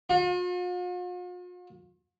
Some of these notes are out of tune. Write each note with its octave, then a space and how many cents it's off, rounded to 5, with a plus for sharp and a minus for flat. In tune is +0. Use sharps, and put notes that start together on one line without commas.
F4 +45